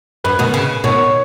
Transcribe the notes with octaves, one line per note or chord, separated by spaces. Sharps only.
F#2 B4
B2 D#3
C#3
B2 D#3 C#5